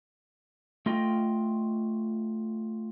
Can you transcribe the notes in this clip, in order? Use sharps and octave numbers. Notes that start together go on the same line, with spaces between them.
A3 F4 D#5 G5